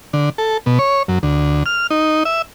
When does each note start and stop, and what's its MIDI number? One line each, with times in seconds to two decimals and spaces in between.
0.13 0.30 50
0.38 0.57 69
0.66 0.79 47
0.79 1.03 73
1.08 1.19 42
1.23 1.63 38
1.66 1.87 89
1.90 2.23 63
2.25 2.42 76